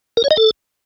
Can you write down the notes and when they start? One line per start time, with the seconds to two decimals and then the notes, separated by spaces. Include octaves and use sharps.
0.17 A#4
0.24 C#5
0.31 D#5
0.37 A4